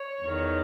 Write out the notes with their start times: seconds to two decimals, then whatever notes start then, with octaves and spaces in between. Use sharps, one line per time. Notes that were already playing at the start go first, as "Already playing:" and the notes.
Already playing: C#5
0.21 E2 D#3